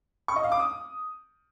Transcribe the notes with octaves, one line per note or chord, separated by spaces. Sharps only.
C#6
D#5
F5
D6
D#6